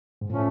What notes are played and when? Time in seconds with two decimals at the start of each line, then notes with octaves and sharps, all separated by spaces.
0.21 G#2
0.30 A2 F3 A3 C#4